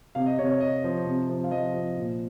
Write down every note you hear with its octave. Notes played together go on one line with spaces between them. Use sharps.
C3 F5
D#5
C3 C#5
C#5
C3 D#5
F3
C3
F3
F5
F3 D#5
F3
A#2